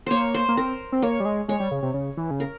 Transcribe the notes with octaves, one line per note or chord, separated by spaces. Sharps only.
A#3 C5 C#5
C5
A#3
C4 A#4
C4
A#3 C#5
G3
G#3
G#3 C#5
G3
C#3
C3
C#3
E3
C#3
A#4